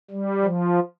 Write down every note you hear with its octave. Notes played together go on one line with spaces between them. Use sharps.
G3
F3